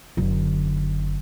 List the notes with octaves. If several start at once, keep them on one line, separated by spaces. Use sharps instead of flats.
F#1 D3